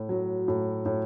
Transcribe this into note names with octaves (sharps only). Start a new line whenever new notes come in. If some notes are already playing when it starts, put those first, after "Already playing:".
Already playing: A2
F#3
A2
A2